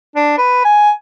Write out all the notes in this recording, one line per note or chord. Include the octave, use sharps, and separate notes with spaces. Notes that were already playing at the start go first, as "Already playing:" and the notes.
D4
B4
G#5